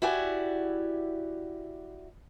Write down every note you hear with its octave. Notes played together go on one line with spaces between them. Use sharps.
E4 F#4 G4 D5 G#5